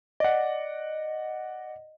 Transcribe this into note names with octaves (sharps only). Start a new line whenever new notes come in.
D5 D#5 F#5